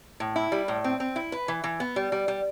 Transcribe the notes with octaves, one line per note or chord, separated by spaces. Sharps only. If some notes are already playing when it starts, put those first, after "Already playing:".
A2
E4
G3
A2
C4
C4
E4
B4
E3
E3
B3
G3
G3
G3